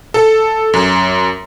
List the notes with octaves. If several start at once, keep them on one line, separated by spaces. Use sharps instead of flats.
A4
F#2